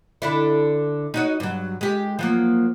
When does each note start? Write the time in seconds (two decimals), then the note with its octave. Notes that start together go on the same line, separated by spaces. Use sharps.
0.22 D3 D4 E4
1.14 D#4 F#4 C#5
1.40 G2 F#3
1.81 G#3 G4
2.19 F3 F#3 A#3